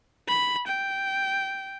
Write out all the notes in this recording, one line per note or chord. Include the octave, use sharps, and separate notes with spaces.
B5
G5